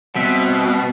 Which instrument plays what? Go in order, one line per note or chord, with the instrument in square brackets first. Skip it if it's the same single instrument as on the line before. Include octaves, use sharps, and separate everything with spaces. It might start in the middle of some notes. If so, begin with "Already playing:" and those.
[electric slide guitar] B2 [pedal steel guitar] G3 C4 E5